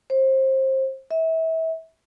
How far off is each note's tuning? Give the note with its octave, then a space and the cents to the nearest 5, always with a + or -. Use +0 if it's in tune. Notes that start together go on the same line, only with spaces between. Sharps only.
C5 +25
E5 -30